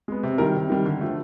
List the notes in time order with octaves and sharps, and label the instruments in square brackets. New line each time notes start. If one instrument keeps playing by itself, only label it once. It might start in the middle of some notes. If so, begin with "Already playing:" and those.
[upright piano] G#3 B3
C3
D#3 G3 A#4
C3
D#3 G3
D3
F3 A3